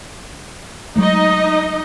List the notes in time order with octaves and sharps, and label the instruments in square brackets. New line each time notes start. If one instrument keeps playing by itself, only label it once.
[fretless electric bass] F#3 G#3 A3 [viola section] D#4 D#5